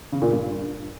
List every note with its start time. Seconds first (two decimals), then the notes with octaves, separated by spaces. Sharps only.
0.12 C#3
0.22 A#2
0.31 G2